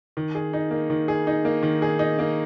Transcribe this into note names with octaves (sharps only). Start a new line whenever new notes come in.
D#3
G#4
D#4
A#3
D#3
G#4
D#4
A#3
D#3
G#4
D#4
A#3